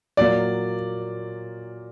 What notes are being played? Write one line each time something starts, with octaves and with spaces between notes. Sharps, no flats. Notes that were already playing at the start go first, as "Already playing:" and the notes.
A#2 F#3 A#3 D5